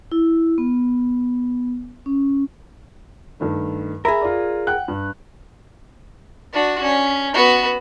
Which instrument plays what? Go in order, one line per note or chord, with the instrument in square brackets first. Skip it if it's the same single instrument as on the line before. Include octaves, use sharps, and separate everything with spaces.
[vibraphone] E4
B3
C#4
[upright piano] G2 D#3 A3
[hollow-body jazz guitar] G#4 A#4 [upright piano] E5 B5
[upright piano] F4 D5
F#5 G5 F#6
G2
[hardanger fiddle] D4 F#4
C#4
B3 F#4